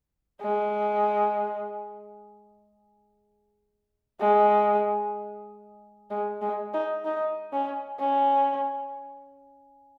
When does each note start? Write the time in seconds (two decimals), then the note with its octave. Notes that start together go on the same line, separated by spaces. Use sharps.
0.41 G#3
4.20 G#3
6.10 G#3
6.42 G#3
6.74 D#4
7.05 D#4
7.53 C#4
8.00 C#4